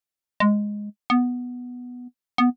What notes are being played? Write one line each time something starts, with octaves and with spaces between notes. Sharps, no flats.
G#3
B3
B3